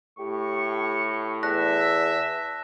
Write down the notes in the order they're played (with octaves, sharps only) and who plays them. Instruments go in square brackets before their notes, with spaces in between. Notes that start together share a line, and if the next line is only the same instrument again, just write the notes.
[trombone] A2 [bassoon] G4 [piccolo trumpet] C#6
[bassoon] E2 [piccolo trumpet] E5 [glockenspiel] A5 F#6 A#6